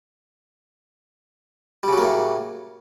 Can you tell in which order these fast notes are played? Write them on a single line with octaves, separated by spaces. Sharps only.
G3 C#3 F#3 A#3 A2